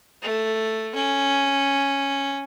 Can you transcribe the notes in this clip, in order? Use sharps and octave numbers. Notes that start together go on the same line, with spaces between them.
A3
C#4